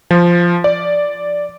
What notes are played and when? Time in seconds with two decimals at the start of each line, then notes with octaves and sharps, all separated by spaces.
0.11 F3
0.64 D5